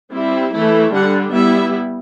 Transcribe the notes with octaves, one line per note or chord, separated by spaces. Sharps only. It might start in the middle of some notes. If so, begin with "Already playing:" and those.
G3 C4 E4
E3 A3 E4
D3 G3 D4 F#5
G3 B3 E4 E5